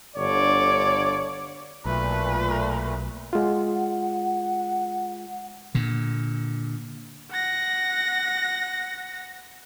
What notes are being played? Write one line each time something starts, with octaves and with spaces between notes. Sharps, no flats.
G1 D3 C#5 D5
B1 A#2 A3 B4
G#3 F4 F#5
A#2 D3
F#5 A#6